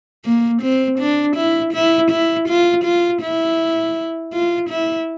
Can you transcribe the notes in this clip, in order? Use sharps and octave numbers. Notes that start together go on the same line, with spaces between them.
A#3
C4
D4
E4
E4
E4
F4
F4
E4
F4
E4